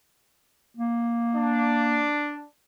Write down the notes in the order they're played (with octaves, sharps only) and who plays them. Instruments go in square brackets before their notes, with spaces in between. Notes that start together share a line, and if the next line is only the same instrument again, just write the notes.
[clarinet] A#3
[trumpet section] D4